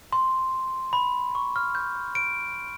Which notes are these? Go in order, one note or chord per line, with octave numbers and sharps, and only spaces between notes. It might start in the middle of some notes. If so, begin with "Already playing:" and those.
C6
B5
C#6
F6
G6
D7